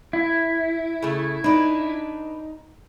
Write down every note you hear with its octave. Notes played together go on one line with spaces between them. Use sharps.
E4
C#3 A3
D4 D#4 B4